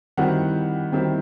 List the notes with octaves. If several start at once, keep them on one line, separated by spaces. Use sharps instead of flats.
D#3 G3 C4 E4 F#5
D#3 G3 C4 E4